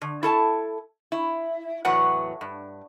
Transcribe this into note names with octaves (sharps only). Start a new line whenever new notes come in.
D3
E4 A4 A5
E4
E2 A2 F#3 B4 F#5
G2